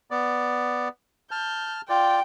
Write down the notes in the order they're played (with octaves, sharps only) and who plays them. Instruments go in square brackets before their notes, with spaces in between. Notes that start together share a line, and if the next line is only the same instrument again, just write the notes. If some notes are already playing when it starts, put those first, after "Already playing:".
[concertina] B3 D5
[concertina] A5 F6 [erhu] G6
[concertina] F4 D5 [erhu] G5